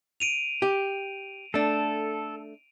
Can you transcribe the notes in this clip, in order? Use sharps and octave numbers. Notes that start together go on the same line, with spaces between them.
D7 D#7 F7
G4
A3 D4 A4